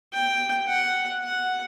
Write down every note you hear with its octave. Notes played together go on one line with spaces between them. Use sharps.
G5
F#5
F#5